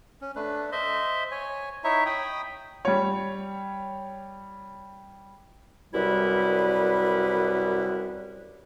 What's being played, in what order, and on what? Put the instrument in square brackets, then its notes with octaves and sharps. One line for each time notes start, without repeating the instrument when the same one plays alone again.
[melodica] C#4
A3 D4 B4
C5 D#5 E5
C#5 G#5
D#4 E4 C#5 E5
G5 B5 D#6
[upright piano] G3 C#5
[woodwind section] C2 F#2 G3 E4 B4